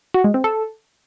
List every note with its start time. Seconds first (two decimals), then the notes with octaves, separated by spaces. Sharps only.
0.14 F#4
0.24 G#3
0.34 C4
0.44 A4